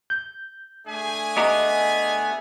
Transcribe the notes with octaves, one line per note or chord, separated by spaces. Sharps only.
G6
A3 D4 G#4 E5 G#5
B3 G4 D#5 A#5